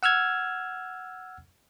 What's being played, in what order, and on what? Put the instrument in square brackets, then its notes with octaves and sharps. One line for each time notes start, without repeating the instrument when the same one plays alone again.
[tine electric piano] F#5 E6 F6 G#6